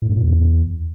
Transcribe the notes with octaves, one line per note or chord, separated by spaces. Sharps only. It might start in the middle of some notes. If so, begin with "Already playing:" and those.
A2
G2
A#2
E2